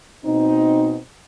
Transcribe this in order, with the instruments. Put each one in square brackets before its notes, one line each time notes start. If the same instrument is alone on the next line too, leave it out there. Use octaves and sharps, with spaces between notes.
[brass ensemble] B2 C4 D#4